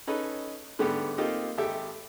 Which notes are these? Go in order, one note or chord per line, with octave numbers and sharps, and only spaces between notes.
C#4 D#4 A4 B4
G#2 D3 G3 A3 B3 G4
A#3 C4 D#4 F4 G4 A4
G#1 G4 A4 E5 G5